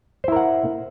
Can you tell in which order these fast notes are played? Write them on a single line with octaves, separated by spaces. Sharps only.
C5 E4 A#4 F#5